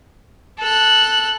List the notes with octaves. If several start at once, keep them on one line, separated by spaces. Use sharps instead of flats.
A4 F#6